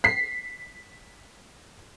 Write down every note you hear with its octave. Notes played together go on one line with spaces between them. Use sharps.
B6 C7